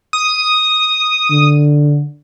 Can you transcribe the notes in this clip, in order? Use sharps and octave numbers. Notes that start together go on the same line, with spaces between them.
D#6
D3